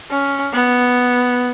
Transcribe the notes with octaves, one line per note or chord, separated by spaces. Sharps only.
C#4
B3